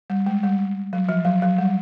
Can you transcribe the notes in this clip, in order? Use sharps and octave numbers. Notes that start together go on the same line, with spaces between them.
G3
G#3
G3
F#3
F3
F#3
F#3
G3